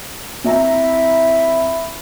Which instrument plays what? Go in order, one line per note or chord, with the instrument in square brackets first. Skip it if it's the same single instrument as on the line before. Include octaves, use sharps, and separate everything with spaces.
[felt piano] C4 E5 A#5 [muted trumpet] E4